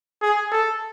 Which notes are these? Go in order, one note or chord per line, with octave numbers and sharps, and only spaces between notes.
G#4
A4